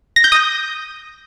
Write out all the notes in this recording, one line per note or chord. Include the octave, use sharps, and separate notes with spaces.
A#6
G6
D#6